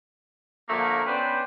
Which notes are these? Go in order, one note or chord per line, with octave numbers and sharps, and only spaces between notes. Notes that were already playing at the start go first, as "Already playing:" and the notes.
D3 F3 A3 A#3
B3 C#4 D4 B4 C5 G5